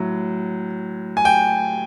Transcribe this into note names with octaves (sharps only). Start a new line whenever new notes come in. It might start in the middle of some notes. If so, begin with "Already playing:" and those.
Already playing: A2 F#3
G#5
G5